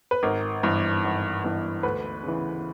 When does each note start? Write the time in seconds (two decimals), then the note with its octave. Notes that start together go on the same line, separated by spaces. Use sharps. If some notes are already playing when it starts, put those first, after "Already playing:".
0.11 B4
0.23 G#1 A#4
0.63 G2 E3
1.04 G#1
1.44 G2 E3
1.83 D2 B4
2.23 C#3 E3